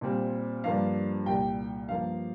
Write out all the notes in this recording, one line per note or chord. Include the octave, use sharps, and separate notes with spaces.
A#2 G3 C4
G2 F3 A#3 D4 F5
C2 A#2 G3 A#3 G5
G2 F3 A#3 F5